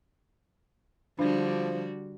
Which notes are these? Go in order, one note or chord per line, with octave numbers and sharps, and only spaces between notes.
D3 F3 G3 D4 F#4